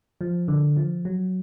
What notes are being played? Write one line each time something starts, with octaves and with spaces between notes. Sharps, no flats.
F3
D3
F3
F#3